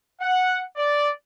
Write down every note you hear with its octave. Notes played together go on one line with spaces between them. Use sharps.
F#5
D5